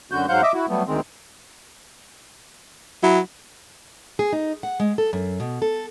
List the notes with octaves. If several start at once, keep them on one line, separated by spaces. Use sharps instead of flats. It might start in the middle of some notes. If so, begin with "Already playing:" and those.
F#2 D3 F#4 G6
G#2 F#3 C5 F5 F#5 G6
D#5 E5 D6
E4 F#4
F#3 G3 A3 B3
D2 D#3 G#3 C4
F#3 E4
G#4
D#4
F#5
G#3
A4
F#2
B2
A4